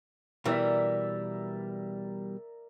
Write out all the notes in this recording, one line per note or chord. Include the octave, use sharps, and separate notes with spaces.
B2 E3 G3 A#4 D5 E5